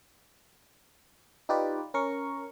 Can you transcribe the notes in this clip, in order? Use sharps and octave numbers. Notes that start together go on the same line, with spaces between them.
D#4 F4 G4 B4 D5
C#4 A#4 C#6